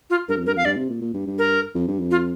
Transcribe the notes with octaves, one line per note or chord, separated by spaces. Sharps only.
F4
G2 A#4
F2
G2 A#4
F2 F5
G2 D5
C3
A#2
A#2
G2
G2
A#4
F2
G2
F2
F4